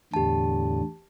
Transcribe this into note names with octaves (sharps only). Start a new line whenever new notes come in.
E2 A2 D3 G4 A5